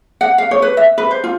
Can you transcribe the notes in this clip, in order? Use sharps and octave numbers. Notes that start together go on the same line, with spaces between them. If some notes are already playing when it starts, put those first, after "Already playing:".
F#5
F5
C#5
B4
E5
B4
C5
F4